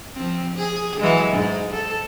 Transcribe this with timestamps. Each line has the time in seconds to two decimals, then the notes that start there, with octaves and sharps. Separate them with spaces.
0.14 F3 C4
0.56 G#4
1.00 E3 F#3 G#3
1.32 G#2 G#4
1.73 A4